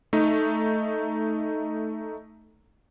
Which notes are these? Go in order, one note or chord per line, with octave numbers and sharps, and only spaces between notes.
A3 D#4